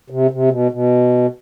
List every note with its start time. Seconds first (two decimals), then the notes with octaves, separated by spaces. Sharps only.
0.10 C3
0.31 C3
0.51 B2
0.72 B2